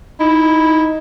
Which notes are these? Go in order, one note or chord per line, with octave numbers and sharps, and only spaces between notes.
D#4 E4